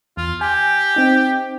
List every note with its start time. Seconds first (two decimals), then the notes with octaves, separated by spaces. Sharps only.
0.17 E2 F4
0.41 G4 G#5
0.95 C4 D#4 G5